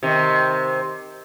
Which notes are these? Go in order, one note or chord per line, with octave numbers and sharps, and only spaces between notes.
C3 D#3